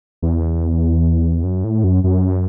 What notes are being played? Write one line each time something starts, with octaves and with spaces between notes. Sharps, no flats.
E2
F#2
A2
F#2
F#2